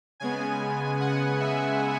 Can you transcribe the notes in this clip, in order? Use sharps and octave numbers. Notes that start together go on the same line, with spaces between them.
C#3 G#3 B3 G#5
F#5
E5